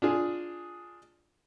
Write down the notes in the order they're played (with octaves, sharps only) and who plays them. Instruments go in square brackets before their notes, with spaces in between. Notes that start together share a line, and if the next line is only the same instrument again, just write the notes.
[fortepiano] D4 F4 G#4